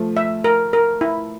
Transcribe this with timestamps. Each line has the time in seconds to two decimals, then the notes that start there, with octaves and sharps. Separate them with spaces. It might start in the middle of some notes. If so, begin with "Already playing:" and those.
Already playing: F3 A3
0.17 E5
0.44 A#4
0.73 A#4
1.01 E4